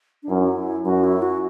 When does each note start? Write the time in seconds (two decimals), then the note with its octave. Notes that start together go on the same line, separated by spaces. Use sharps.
0.23 D4
0.29 F#2 E4
0.85 F#2 F#4
1.04 E4
1.22 F#4